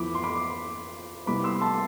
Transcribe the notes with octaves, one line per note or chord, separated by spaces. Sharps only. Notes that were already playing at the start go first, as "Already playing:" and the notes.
Already playing: F2 E3 B3 B5 D6
C6
B5 D6
C2 C3 G3 B3 B5 D6
C6 E6
A5 C6